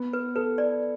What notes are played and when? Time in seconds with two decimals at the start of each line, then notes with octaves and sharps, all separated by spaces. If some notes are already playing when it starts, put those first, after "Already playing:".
Already playing: B3
0.13 B4
0.36 A4 B4
0.58 D5